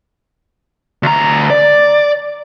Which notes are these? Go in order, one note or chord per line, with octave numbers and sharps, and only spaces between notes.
D2 A#5
D5